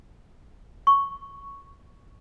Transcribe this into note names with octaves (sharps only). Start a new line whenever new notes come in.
C#6